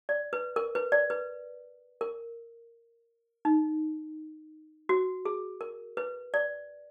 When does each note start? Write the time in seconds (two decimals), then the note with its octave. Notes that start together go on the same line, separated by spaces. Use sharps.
0.09 D5
0.33 B4
0.56 A#4
0.75 B4
0.92 D5
1.10 B4
2.01 A#4
3.45 D#4
4.89 F#4
5.25 G#4
5.61 A#4
5.97 B4
6.34 D5